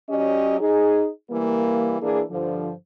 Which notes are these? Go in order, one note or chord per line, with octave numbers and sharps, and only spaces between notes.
F#3 C#4 G4 D5 D#5
D#4 G#4
E3 G3 A#3
E3 A#3 D4 G#4
G2 D3 F3